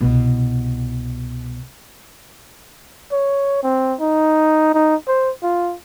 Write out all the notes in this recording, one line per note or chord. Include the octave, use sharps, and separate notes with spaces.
C2 B2
C#5
C4
D#4
D#4
C5
F4